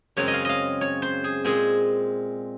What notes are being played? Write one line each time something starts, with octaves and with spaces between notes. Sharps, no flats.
F#2 C#3 G#3 C4 C#5
D#5
F5
D#5 F5
C#5
C5
G#4
A#2 G#3 C4 G#4